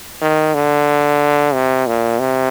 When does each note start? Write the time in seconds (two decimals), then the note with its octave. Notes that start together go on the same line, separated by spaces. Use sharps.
0.21 D#3
0.54 D3
1.54 C3
1.87 A#2
2.19 C3